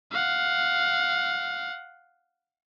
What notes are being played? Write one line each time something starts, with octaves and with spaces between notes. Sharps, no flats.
F5 F#5